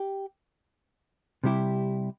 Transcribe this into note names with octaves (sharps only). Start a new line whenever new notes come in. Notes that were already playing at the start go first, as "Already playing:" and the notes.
Already playing: G4
C3 G3 E4 G4